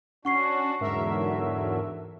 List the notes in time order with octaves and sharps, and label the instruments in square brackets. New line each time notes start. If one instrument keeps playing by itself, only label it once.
[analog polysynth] C#4 [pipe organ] D4 F#4 [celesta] F#5 C#6 C7
[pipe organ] E2 D3 F#3 [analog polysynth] G#2 A#4 E5